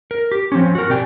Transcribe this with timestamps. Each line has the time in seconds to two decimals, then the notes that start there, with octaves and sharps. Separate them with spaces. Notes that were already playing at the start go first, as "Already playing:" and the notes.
0.11 A#4
0.32 G4
0.52 F3 C4 C#4
0.75 F#4 A#4
0.89 B2 C4 G4 D5 G5 G#5